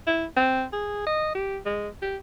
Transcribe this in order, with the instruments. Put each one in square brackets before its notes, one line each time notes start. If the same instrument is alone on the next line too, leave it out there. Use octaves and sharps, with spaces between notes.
[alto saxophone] E4
C4
G#4
D#5
G4
G#3
G4